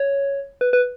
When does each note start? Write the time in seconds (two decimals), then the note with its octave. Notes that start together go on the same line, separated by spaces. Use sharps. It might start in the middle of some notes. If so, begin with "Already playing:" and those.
Already playing: C#5
0.61 B4
0.73 B4